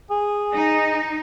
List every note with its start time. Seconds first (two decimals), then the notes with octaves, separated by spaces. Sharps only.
0.11 G#4
0.53 D#4